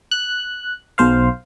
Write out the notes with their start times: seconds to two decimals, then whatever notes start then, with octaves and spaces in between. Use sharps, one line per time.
0.11 F#6
0.98 B1 C5 F5